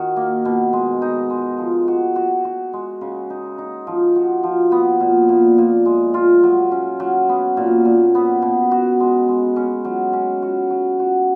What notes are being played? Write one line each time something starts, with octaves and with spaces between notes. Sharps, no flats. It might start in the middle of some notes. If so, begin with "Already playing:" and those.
Already playing: D#3 F#4
A#3
B2
G#3
D#4
G#3
F3
F#4
F#4
F#4
G#3
C#3
D#4
D#4
F3
F#4
F3
B3
A#2
A#2
A#2
G#3
F4
F#3
C#4
F#3
B3
A#2
A#2
B3
B2
F#4
G#3
G#3
C#4
F#3
C#4
F#4
F#3
F#4